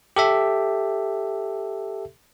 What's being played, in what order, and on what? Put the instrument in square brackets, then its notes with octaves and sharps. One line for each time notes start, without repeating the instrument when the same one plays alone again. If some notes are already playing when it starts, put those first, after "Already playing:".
[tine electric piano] G4 A4 E5